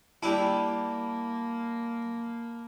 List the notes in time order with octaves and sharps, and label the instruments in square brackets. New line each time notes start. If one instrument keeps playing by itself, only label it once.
[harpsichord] G3 D4 E4 [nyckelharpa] A#3 [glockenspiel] A5 B5